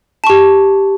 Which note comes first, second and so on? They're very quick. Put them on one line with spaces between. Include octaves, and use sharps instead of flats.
A5 C#6 G4